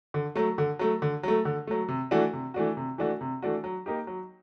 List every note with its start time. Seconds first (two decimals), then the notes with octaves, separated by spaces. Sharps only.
0.14 D3
0.35 F#3 A3
0.58 D3
0.79 F#3 A3
1.02 D3
1.23 F#3 A3
1.45 D3
1.67 F#3 A3
1.88 C3
2.11 E3 A3 D4 F#4
2.33 C3
2.54 E3 A3 D4 F#4
2.77 C3
2.98 E3 A3 D4 F#4
3.21 C3
3.42 E3 A3 D4 F#4
3.64 F#3
3.86 A#3 D#4 G4
4.07 F#3